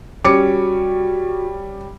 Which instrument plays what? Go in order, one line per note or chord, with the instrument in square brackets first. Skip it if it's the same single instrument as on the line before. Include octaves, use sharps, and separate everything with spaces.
[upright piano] G3 [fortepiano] C#4 [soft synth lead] F#4 [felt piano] D6 C#7